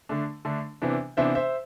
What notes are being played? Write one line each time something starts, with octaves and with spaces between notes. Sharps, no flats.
D3 A3 D4
D3 A3 D4
C3 E3 B3 D4
C3 E3 B3 D4 C5 E5
C5 E5